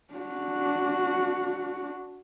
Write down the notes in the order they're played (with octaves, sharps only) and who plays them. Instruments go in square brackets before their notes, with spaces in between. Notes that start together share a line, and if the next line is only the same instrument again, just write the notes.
[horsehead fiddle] D4 F#4